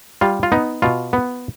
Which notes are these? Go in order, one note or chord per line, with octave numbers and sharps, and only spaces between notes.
G3 F4
F4
B3 D#4
B2 F4
B3